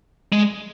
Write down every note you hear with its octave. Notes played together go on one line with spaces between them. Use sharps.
G#3